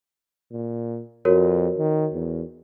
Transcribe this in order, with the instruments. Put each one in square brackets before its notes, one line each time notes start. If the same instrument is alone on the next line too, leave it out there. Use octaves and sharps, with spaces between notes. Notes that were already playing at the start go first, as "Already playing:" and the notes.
[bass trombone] A#2
[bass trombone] F2 [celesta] F#4 A#4 C#5
[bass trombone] D#3
E2